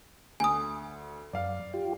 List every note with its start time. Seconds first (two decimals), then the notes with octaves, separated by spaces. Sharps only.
0.40 D2 G#5 D#6
1.33 F#2 D5 F5
1.73 F4 G4